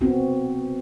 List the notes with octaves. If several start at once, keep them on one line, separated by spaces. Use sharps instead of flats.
B3 C4 F#4